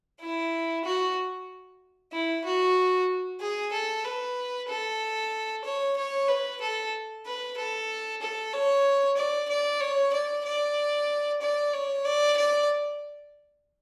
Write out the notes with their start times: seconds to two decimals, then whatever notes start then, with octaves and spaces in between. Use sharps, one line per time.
0.21 E4
0.85 F#4
2.12 E4
2.45 F#4
3.41 G#4
3.73 A4
4.05 B4
4.69 A4
5.65 C#5
5.97 C#5
6.28 B4
6.61 A4
7.26 B4
7.57 A4
8.22 A4
8.53 C#5
9.17 D5
9.49 D5
9.81 C#5
10.14 D5
10.45 D5
11.42 D5
11.73 C#5
12.05 D5
12.37 D5